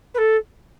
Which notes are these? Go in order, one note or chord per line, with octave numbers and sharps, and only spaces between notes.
B4
A4